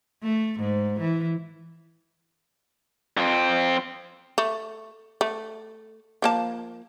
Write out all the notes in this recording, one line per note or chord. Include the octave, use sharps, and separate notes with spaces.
A3
G#2
E3
F2 C4
A3
A3
F3 A#3 A5